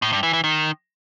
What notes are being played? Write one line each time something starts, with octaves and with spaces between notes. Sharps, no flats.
A2
G2
E3
E3
D#3